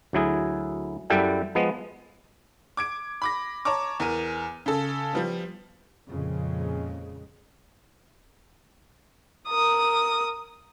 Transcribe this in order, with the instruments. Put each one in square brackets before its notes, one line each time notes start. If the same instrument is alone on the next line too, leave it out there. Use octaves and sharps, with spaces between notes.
[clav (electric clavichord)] D2 F#3 E4 G#4
F#2 G3 E4 A4 F#5 G5
F3 G#3 B3
[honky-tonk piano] D6 G#6 D7
B5 D6 A#6
C#5 A5 A#5 C#6 D6
E2 A#4 D#7
C#3 A4
F3 G3 B3
[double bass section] F2 A#2 C#3 G#3
[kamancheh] A#4 D#6